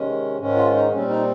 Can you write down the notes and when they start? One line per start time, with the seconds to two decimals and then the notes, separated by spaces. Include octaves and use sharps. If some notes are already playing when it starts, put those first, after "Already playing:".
Already playing: C3 D#3 G#3 C#4
0.38 G#2 D#3 G#3 C#4
0.56 F4
0.74 D#4
0.91 A#2 G3 C4 C#4
1.09 D#4